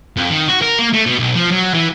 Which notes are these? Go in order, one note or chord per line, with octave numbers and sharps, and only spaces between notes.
F2
D#3
F#4
A#4
A#3
A3
B2
B1
F3
F#3
E3